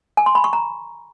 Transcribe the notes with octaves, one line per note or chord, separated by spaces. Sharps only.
G#5
C6
B5
C#6
A#5